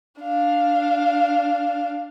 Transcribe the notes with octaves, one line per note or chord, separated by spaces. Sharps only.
D4 F5